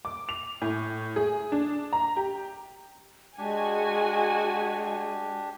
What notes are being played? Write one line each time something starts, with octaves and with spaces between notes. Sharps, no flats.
D6
F7
A2
G#4
D4
A#5
G4
G#3 D4 F#4 G4 G#5